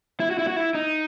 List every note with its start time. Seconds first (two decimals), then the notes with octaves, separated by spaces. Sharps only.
0.20 E4
0.30 F#4
0.39 E4
0.47 F#4
0.56 E4
0.75 D#4